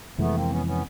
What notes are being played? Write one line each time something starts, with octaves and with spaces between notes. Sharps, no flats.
F2 C3 E3 G#3 A3 B3
A#3 C4
B3 C#4
B3 C#4